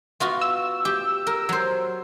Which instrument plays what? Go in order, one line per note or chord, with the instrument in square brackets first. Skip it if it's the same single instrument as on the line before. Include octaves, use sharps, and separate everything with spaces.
[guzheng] B3 F4 F#4
[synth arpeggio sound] E6
[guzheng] G4
A#4
F#3 C5